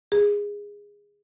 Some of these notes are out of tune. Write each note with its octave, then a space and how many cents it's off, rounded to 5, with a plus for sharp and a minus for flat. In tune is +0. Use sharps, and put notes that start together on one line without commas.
G#4 -15